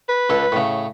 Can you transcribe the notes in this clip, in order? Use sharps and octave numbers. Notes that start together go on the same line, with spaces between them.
B4
C#2 A4
A2 C#3